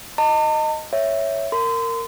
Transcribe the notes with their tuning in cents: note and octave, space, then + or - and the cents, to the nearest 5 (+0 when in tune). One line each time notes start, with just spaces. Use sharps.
D#5 +0 A5 +45
C#5 +0 E5 +0
A#4 -20 C6 -35